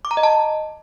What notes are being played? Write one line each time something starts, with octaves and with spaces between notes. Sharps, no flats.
D6
A#5
D#5
A5